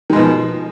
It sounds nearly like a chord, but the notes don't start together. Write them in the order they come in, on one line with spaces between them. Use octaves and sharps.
D#3 G#3 B2 F3